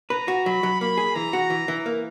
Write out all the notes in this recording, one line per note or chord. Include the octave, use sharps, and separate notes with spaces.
B4 A#5
F#4
F#3 B5
F#3
A#3 B5
G#4
E3 A#5
F#4
E3
E3
A#3